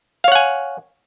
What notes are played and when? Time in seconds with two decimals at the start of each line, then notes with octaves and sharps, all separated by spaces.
0.24 F5
0.28 C#5
0.32 F#5
0.35 G#5